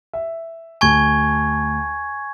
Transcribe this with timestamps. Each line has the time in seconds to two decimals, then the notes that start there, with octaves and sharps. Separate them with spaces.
0.13 E5
0.81 D2 G#5 A5 C#6 G#6